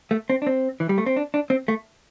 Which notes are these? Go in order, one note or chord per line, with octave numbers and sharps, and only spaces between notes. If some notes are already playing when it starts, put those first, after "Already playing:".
A3
C4
D4
C4
E3
G3
A3
C4
D4
D4
C4
A3